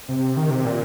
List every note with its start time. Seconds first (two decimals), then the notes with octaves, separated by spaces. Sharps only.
0.09 C3
0.37 D#3
0.50 C3
0.65 A#2